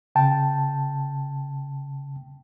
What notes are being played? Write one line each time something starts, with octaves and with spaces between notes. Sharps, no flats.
C#3 G5 A5